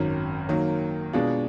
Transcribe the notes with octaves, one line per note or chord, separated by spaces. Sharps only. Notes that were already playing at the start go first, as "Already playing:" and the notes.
Already playing: G#1 F#2 D#3 F#3
D#3 F#3 A#3
B2 G#3 D4 F4